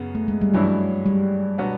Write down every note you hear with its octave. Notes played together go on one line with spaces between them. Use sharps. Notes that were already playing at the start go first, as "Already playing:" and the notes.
Already playing: F#2 C#3 B3
A3
G#3
G3
G2 E3 F#3 G#3 C#4 E4
G3
B2 F#3 B3 D4